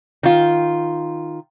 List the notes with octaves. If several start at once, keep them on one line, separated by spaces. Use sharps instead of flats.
D#3 F4